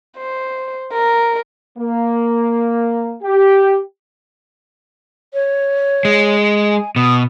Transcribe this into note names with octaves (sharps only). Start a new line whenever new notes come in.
C5
A#4
A#3
G4
C#5
G#3
G#5
B2 D#6